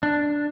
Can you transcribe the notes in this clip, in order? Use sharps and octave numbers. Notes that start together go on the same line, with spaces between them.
D4